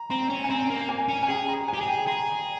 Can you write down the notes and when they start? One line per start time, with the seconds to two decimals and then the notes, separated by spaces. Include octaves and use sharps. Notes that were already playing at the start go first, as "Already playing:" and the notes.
Already playing: A#5
0.10 C4 A#5
0.30 C#4
0.44 G#5
0.50 C4 A#5
0.70 A#3
0.89 G#5
1.08 C#4
1.23 G#5
1.28 G#4 G5
1.48 A#5
1.68 G#5
1.74 G4
1.81 G#4
1.87 G5
2.07 G#4 A#5